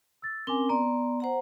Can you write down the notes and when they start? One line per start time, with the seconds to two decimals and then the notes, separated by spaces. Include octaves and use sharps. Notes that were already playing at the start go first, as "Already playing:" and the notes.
0.22 E6 A6
0.47 C4 C#4 A#4 G#5 D6 G7
0.69 B3 D5 A#5 C6
1.20 C5 F#5 A#5